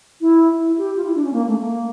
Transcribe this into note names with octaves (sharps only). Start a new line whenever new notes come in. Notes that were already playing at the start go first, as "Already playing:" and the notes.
E4
E4
G4
F4
E4
D4
C#4
A#3
A3
A#3